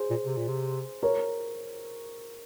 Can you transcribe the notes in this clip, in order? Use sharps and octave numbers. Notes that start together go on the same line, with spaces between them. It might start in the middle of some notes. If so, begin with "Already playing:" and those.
Already playing: G#4 C5
A#2
C3
A#2
C3
A#4 C#5